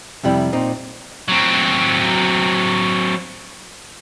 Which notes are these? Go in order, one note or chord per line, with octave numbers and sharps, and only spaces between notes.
F2 C3 G3 E4
A#2 C4 D#4
F#3 C4